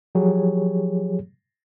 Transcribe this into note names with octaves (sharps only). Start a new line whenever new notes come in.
F3 F#3 G4 G#4 C#5